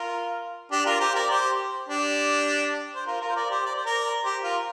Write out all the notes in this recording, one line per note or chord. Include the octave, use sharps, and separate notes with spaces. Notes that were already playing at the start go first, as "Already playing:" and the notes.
Already playing: F4 A#4
D4 G4
F4 A#4
G4 C5
A#4 D5
G4 C5
D4 G4
C5
F4 A#4
F4 A#4
C5
A#4 D5
G4 C5
D5
C5
A#4 D5
G4 C5
F4 A#4